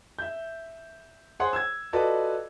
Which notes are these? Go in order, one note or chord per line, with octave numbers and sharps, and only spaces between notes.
E5 G6
G#4 C5 C#5 F#5 C6
E6 G#6
F4 F#4 A4 B4 D5 D#5